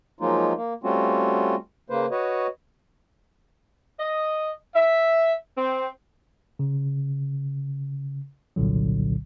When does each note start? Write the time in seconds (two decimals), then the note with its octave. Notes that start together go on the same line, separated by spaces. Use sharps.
0.20 F3 F#3 G#3 A#3 D#4 F4
0.56 A#3
0.84 G3 A3 C4 C#4 F4 F#4
1.90 C#3 A#3 B4 C5
2.11 F#4 B4 C#5 D#5
3.99 D#5
4.75 E5
5.57 C4
6.59 C#3
8.56 G1 C2 A#2 D3 F#3